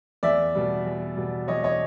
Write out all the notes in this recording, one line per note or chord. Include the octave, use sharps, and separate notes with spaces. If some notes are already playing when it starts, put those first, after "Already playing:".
E2 D5 E5
B2 G3
E2
B2 G3
E2 C#5 D#5
C#5 D#5